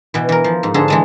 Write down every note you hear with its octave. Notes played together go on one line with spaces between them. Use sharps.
B2 E3
E3 A#4
F3
G#2
G#2 D3 G#4 A4
E3 G#3 A5